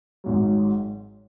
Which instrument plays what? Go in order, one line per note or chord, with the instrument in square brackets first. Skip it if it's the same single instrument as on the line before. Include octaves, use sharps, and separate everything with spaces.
[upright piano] G#1 G#2 F#3